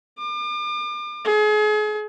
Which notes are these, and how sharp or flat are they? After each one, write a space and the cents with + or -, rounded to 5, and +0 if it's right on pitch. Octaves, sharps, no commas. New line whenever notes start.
D6 +40
G#4 +35